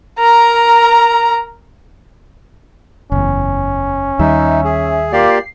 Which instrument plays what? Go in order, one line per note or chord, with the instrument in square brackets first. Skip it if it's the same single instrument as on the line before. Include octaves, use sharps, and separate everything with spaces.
[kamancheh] A#4 A#5
[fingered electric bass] F#1 E2 [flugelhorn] C#4
[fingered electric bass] D#2 D#3 G3 [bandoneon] D#4 [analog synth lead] E5
[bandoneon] G#4
[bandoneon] A#3 G4 D5 [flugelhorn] F4 [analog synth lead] C7